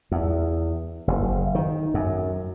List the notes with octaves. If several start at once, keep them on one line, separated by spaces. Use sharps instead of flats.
E2
F#1
D#3
F#2